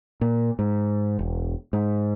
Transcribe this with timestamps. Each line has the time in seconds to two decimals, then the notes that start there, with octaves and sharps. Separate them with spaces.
0.21 A#2
0.59 G#2
1.19 E1
1.73 G#2